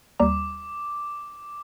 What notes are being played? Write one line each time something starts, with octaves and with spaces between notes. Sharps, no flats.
D#2 G3 A#5 D6